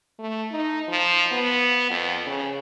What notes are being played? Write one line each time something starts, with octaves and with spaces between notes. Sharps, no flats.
A3
D#4
F3
B3
F2
C#3